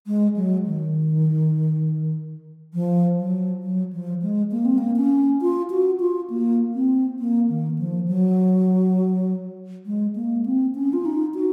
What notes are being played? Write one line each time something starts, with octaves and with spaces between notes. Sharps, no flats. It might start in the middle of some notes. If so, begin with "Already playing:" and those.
G#3
F#3
D#3
F3
F#3
F#3
F3
G#3
A#3
C4
A#3
C#4
F4
F#4
F4
A#3
C4
A#3
D#3
F3
F#3
G#3
A#3
C4
C#4
F4
D#4
F#4